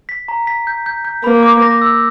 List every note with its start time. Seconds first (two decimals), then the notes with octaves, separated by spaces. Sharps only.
0.09 B6
0.28 A#5
0.47 B6
0.67 G6
0.86 G6
1.05 G6
1.24 A#3 B5
1.43 D6
1.62 A#6
1.81 E6